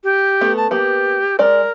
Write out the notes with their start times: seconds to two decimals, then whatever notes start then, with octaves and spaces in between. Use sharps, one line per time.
0.04 G4
0.41 A3 B3
0.56 A5
0.71 A#3 B3 G4
1.39 G#3 A#4 D5